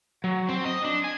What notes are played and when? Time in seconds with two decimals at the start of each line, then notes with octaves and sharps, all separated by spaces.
0.24 F#3
0.49 C4
0.65 D#5
0.84 D4
1.04 G#5